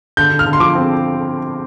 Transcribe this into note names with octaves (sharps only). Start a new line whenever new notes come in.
D3 G6
D3
F6
D3
C6
F3 D6
C4